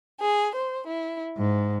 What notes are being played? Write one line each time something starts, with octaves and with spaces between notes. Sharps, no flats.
G#4
C5
E4
G#2